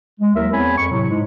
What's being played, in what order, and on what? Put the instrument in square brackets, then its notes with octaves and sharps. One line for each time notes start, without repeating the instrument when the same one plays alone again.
[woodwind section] G#3
D#2 F#3 E4 A#4 E5
E2 B3 C4 C#5 G#5 B5
F2 C#6
A2 C3 F#3
G#2 G#3